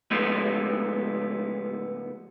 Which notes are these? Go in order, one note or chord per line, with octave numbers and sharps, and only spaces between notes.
C#2 G#2 F3 A3 B3